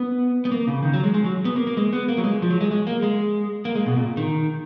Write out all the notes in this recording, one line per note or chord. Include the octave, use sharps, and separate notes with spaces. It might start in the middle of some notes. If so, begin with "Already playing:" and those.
Already playing: B3
B3
A#3
C#3
D#3
F#3
G#3
G#3
F#3
B3
A#3
A#3
G#3
B3
A#3
F#3
G#3
F3
F#3
G#3
G#3
A#3
G#3
A#3
G#3
B2
A#2
D#3